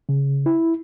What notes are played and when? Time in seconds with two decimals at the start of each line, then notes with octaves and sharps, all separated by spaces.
0.09 C#3
0.46 E4